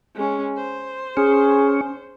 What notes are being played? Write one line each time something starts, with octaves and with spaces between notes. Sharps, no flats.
G#3 C#4
C5
C#4 G#4